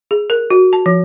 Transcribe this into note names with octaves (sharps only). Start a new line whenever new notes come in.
G#4
A#4
F#4
A5
F3